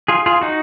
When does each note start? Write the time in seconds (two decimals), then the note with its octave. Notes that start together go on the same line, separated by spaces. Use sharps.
0.08 F4 G#4
0.26 F4 G#4
0.41 D#4 F#4